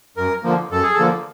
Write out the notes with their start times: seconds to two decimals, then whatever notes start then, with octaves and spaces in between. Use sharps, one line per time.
0.17 F#2 A#4
0.43 D3 F3 A#3
0.71 F#2 A4
0.83 G#4
0.94 A4
0.98 D3 F3 A#3